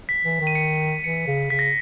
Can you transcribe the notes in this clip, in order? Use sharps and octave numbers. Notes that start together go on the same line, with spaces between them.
B6
E3
D#3
D#7
C#7
E3 C#7
C#3
C#3 B6
A#6